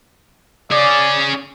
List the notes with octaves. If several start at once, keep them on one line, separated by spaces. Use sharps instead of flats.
C#4 G#4 D5